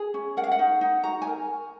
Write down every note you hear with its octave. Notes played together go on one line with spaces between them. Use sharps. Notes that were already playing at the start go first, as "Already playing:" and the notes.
Already playing: G#4
C#4
A#4 F#5
F5
F#5
D#4
D#4
F#4 A#5
G#5
A#4